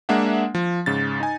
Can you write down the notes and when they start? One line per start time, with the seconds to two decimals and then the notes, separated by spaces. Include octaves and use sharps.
0.09 G#3 A#3 D4 E5 F#5
0.55 F3
0.86 G#2 C#3 A6
1.20 D#4 G#5